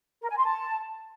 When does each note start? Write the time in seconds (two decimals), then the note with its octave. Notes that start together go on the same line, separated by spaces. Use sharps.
0.22 A#4
0.29 G#5
0.37 C6
0.45 A5